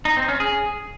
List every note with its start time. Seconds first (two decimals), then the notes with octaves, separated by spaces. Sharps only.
0.05 D#4
0.17 C4
0.28 C#4
0.40 G#4